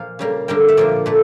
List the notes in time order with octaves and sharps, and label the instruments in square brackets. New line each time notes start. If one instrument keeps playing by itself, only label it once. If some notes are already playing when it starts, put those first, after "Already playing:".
Already playing: [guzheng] A#2 F3 F5
C#3 G3 A#3
D3 G3 A#3 G5
E5
A#2 F3 A#3 D5
A#2 A3